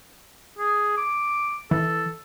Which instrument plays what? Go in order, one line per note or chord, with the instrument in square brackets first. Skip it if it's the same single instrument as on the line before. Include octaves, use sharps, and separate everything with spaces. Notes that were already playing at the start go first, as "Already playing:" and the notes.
[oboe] G#4
D6
[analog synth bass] E3 [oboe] A4